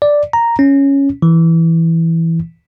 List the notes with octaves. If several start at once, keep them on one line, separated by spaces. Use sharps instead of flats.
D5
A#5
C#4
E3